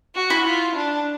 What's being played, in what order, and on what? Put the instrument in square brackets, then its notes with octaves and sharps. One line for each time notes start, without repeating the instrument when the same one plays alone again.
[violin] F#4
[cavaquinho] E4
[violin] F4
D4